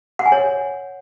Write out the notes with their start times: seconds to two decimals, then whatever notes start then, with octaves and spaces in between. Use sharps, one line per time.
0.19 F#5
0.26 G#5
0.32 C#5